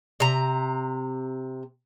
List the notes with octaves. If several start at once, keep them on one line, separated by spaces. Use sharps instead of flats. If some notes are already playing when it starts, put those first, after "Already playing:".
C3 A#5